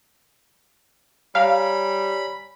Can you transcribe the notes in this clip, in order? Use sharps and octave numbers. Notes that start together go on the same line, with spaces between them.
G3 C#5 F5 G#5 A#5 B5